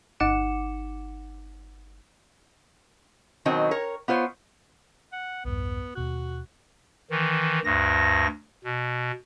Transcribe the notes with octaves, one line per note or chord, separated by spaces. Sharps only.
G1 D#4 F#5 D6 C#7 E7
B2 D#3 F#3 C4 D#5
A#4 C#5
B3 F4 C5 C#5
F#5
B1 E2 G2 B3
D#2 B2 F#4 F#6
D#3 E3
D2 G2 A#6
B2